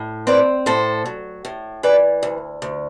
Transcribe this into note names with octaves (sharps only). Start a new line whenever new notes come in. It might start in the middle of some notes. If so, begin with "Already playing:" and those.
Already playing: A2
C4 B4 D5
A2 A4 C5
F#3
A2
E3 B4 D5
D2
D2